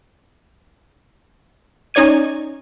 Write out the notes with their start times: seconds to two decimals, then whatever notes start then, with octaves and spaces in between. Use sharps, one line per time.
1.94 C#4 D#4 C#5 D5 G#6 D#7